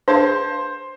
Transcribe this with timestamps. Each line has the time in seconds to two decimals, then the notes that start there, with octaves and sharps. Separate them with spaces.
0.08 D4 G#4 B4 C5 F5